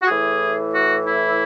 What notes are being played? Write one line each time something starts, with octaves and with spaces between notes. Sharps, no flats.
F#4
A2 E3 G#4
F#4
E4